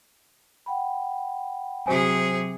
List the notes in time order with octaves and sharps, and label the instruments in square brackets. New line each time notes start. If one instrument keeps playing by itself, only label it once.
[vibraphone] F#5 G5 B5
[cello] C3 G#4 [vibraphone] F#3 [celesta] F#4 C5 G#5